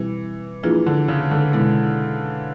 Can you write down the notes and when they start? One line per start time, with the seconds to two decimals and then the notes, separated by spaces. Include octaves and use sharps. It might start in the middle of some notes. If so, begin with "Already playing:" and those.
Already playing: B2 E3 G3 C4 E4 G4
0.63 E3 F3 A#3 D4 F4 G#4
0.86 D3
1.08 C#3
1.31 D3
1.53 B2 G#3 B3 E4 A4